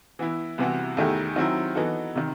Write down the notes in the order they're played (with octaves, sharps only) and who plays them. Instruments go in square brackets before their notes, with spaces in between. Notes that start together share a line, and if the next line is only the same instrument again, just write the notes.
[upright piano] E3 B3 E4
C2 C3 E3 B3 F#4
E2 D#3 A3 E4 G4
D#3 F#3 C4 E4
E3 B3 D#4 F#4 A4
C3 D#3